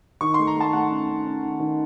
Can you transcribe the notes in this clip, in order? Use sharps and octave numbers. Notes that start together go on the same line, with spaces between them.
D#3 C#6
C6
A3
A#5
A3 A5
A3 F#5
C#4
C#4
C#4
D#3
D#3